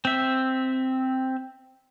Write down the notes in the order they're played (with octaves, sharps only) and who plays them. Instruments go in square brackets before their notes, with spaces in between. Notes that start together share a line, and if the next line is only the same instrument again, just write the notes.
[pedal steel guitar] C4 E5